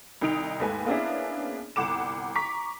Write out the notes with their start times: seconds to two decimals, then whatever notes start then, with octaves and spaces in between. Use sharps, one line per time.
0.21 C2 D#3 D#4 D7 F7
0.60 D#2 G#2 A3 B4 G#5
0.86 A#3 B3 C#4 D4 E4 G#4
1.76 G1 C2 F#5 D6 E7
2.35 A#5 C#6 D6 B6